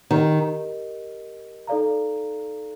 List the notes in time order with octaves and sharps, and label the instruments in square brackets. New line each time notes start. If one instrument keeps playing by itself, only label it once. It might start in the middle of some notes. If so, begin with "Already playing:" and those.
[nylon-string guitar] D#3 [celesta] G4 A#4 D#5
[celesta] D#4 A4 D5 F5 A#5